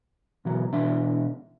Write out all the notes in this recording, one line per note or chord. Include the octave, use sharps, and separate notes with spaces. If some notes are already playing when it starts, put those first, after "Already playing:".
B2 E3 F#3
B2 E3 D4 E5